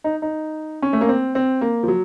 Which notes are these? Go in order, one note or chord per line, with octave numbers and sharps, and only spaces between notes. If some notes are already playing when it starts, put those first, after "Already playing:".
D#4
D#4
C#4
A3
A#3
C4
C4
A#3
F3
F#3